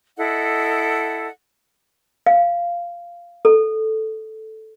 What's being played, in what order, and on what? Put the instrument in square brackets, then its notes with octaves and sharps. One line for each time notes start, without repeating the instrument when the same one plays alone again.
[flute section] E4 A4 D#5 F#5
[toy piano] F5
A4